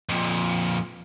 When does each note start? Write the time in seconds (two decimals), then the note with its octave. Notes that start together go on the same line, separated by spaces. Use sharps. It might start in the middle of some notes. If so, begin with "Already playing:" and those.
0.09 F2 A#2